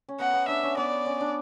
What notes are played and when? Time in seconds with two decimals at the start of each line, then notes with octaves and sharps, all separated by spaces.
0.08 C#4
0.19 B3 F#5
0.33 B3
0.48 D4 E5
0.63 C#4
0.77 B3 D5
1.06 C#4
1.21 D4